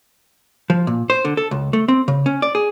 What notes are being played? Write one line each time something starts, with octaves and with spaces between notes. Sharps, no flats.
F3
A#2
C5
D3
A4
C#2
A3
C4
C#3
C#4
D5
G#4